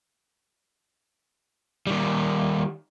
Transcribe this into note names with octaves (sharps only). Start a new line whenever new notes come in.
D#3 G3